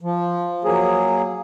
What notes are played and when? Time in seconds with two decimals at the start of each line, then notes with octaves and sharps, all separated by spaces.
0.01 F3
0.64 F#3 A#3 G#4